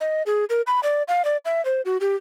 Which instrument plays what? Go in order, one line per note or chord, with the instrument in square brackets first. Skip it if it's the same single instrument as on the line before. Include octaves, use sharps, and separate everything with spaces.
[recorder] D#5
G#4
A#4
B5
D5
F5
D5
E5
C5
F#4
G4